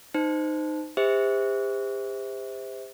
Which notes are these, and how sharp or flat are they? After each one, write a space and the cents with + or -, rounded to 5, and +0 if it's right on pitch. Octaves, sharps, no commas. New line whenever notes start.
D#4 -15 C5 -20
G4 +40 C5 -15 E5 -25